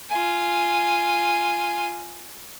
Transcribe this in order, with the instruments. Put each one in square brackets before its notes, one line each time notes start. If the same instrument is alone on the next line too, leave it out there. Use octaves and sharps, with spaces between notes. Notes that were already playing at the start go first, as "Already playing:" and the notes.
[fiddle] F4 G#5